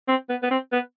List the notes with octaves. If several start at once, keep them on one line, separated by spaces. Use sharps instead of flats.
C4
B3
B3
C4
B3